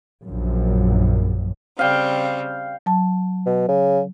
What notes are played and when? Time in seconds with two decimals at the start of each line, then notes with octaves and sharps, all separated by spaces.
0.25 A#1 F#2
1.79 C#3 G3 C4 F5 G5
2.86 F#3 A5
3.46 B2
3.69 C#3